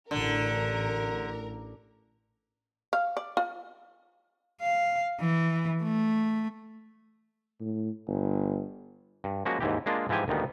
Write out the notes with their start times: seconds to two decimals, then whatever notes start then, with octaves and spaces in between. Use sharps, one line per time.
0.11 A1 D3 A#4
2.93 F5
3.17 D5
3.37 F4
4.62 F5
5.20 E3
5.83 A3
7.60 A2
8.08 G1
9.24 G2
9.45 F3 G#3 A#3 C#4 F#4
9.60 D#2 G#2 E3 G4
9.86 G#3 A#3 D4 F4
10.09 G#2 E3 F3 G4 G#5
10.28 D2 A#2 D#3 G3 B3